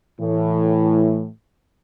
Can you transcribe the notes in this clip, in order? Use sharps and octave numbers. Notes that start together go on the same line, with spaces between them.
A2 E3